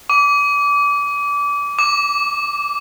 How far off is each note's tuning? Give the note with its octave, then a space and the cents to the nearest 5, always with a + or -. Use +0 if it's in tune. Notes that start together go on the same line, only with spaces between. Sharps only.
D6 -25
D6 +0